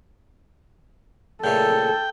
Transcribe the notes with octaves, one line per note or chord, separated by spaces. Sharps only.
A#2 C#3 A3 A4 G5